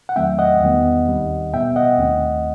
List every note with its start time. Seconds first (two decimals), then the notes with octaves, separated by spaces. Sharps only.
0.09 F#5
0.16 E2 D#3 F#3 A3 C4 E5 G5
0.39 D#5 F#5
0.62 E2 D#3 G3 B3
1.07 D#2 D#3 G3 C4
1.53 B2 G3 B3 E5 G5
1.76 D#5 F#5
1.99 D#2 D#3 A3 C4